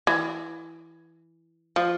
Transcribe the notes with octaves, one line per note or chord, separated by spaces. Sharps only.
E3
F3